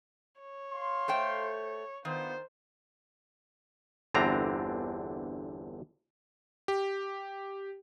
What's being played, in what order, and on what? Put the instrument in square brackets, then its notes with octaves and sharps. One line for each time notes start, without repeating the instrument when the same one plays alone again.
[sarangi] C#5
[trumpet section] F5 C6
[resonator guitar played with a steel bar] A3 C5 G5
[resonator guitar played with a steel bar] D#3 [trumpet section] B3 D4 F4 [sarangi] C5
[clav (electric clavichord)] G1 E2 D3 C4 D4 A#5
[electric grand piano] G4